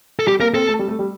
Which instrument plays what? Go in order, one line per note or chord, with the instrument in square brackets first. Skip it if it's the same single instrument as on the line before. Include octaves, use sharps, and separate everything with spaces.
[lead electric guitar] A4
[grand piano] G3 [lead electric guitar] G4
[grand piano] A#3 [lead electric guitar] A#4
[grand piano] C4 [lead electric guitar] A4
[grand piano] A3
G3
A3
G3